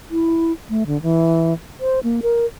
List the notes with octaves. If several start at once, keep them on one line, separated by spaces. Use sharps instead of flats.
E4
A3
D3
E3
C5
A#3
A#4